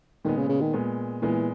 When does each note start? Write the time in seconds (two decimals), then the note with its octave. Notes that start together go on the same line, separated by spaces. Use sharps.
0.25 A#2 D#3 G#3 B3
0.37 C#3
0.49 C#3
0.61 D#3
0.73 A#2 G#3 B3
1.22 A#2 E3 G#3 B3